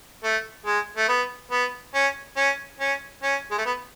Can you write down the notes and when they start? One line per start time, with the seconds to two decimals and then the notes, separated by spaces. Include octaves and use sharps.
0.24 A3
0.66 G#3
0.97 A3
1.09 B3
1.51 B3
1.94 C#4
2.37 C#4
2.80 C#4
3.23 C#4
3.51 G#3
3.58 A3
3.66 B3